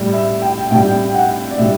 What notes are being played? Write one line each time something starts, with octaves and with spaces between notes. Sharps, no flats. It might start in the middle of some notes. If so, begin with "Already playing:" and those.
Already playing: A2 G3
E5
G5
A2 G3 G5
F#5
D5
A2 G3 E5